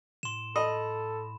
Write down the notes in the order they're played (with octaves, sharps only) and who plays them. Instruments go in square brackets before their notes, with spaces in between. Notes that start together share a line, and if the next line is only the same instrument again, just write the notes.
[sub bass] A2 [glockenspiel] C6 E7
[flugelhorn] A4 [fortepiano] D#5 [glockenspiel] B5